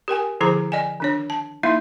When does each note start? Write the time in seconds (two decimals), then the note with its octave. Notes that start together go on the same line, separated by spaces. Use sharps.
0.08 G4 A#4 G5 G#5
0.40 D3 F3 E4 G#4 C5 A#5
0.72 D5 D#5 G5 G#5
1.00 D#3 D4 C#5
1.30 A5
1.63 A#3 D#4 E4 E5 F5 C6